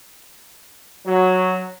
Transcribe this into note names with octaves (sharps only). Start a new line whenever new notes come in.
F#3